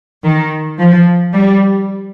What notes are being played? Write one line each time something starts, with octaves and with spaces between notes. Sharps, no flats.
D#3
F3
G3